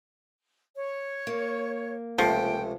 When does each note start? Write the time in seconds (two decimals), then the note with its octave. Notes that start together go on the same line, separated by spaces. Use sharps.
0.75 C#5
1.27 A#3
2.18 C#2 C3 F3 A3 G5